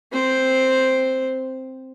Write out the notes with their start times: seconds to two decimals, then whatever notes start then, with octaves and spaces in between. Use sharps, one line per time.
0.13 C4 C5